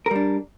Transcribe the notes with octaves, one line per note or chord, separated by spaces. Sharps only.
G3 D4 A#4